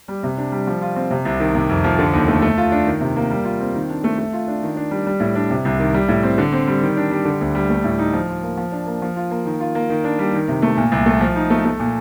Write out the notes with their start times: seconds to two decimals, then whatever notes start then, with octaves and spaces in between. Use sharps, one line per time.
0.08 G3
0.23 C3
0.37 D4
0.52 G3
0.67 F3
0.82 F4
0.96 C4
1.11 C3
1.25 C2
1.40 D#3
1.55 C3
1.69 F2
1.84 F3
1.99 D3
2.13 D#2
2.28 A3
2.42 A3
2.57 F4
2.72 D4
2.86 D#3
3.01 C3
3.16 A#3
3.30 G3
3.45 F4
3.60 C4
3.74 D#3
3.89 D4
4.04 A3
4.18 A3
4.33 F4
4.48 D4
4.63 D#3
4.76 D4
4.91 G3
5.06 G3
5.20 A2
5.35 D4
5.50 C3
5.65 C2
5.79 D#3
5.94 G3
6.08 A2
6.23 C4
6.38 D3
6.52 C4
6.68 G3
6.82 D#3
6.97 D4
7.11 G3
7.25 D3
7.41 D2
7.55 G3
7.70 A3
7.84 A2
7.99 D#4
8.13 F3
8.28 F4
8.43 A#3
8.57 F3
8.72 D4
8.87 A#3
9.02 F3
9.16 F4
9.31 A#3
9.45 D#3
9.60 F4
9.75 A#3
9.89 D#3
10.04 D4
10.19 G3
10.33 D#3
10.48 C3
10.62 A3
10.77 A#2
10.92 C2
11.06 A3
11.21 F3
11.36 D#4
11.50 A3
11.65 A3
11.79 A#2